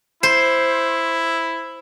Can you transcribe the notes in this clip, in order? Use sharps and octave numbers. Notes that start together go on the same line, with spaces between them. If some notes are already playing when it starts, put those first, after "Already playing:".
E4 C5